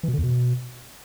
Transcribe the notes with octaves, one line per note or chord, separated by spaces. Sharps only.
E3
B2
D3
E2
B2